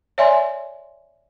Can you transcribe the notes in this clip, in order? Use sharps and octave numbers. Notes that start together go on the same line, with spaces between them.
C#5 D5 E5 G#5 C6